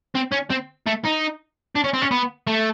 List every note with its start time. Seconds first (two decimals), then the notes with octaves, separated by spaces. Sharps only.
0.15 C4
0.32 C#4
0.50 C4
0.86 A3
1.04 D#4
1.75 D4
1.84 C#4
1.94 C4
2.02 C#4
2.11 B3
2.47 A3